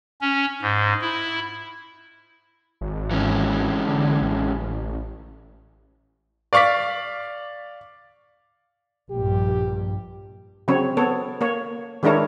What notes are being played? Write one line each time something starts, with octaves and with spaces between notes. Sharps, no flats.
C#4
G#2
E4
G#1
E3 G#3 C#4
D3
A1
D5 F5 C#6 D6 B6
A#1 G2 G4
C#3 F#3 C4 C#5
B3 A4 C#5
A#3 C#5
D#3 G#3 D4 E4 A#4 C#5